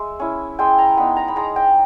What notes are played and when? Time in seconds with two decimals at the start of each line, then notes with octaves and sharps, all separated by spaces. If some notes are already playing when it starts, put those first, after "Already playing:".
Already playing: G#3 E5
0.20 C#4 E4
0.59 G#3 G5
0.78 A#5
0.97 B3 D#4 B5
1.17 A#5
1.28 B5
1.36 G#3 A#5
1.56 G5